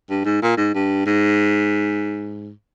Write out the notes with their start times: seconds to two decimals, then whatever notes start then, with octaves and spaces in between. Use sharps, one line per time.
0.10 G2
0.25 G#2
0.42 A#2
0.57 G#2
0.74 G2
1.06 G#2